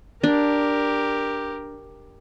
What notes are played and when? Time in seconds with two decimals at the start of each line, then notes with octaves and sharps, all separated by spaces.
0.23 D4 G4 A#4